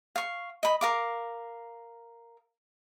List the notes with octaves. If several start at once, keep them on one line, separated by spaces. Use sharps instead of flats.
F5 C#6
D#5 B5
A#4 F5 D6